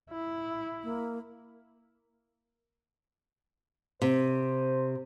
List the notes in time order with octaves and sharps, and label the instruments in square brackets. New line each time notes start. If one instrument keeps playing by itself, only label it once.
[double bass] E4
[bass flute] A#3
[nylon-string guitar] C3 [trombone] C5